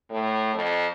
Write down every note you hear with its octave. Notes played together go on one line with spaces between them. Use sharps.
A2
F2